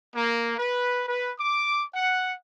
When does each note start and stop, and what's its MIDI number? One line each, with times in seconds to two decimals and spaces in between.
0.15 0.53 58
0.58 1.01 71
1.07 1.30 71
1.40 1.82 86
1.94 2.33 78